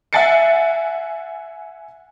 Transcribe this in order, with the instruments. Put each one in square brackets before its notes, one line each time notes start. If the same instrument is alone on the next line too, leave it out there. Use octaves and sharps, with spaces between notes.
[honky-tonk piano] E5 F#5 G#5 A6 C7 C#7